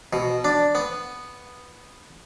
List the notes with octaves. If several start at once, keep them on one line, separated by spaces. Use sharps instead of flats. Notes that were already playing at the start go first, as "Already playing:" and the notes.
B2
D4
B3